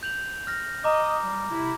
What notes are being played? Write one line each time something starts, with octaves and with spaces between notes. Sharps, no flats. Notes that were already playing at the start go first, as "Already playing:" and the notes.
G6 F7 F#7
F6 A#6
D#5 A#5 D6
G3
C3 E4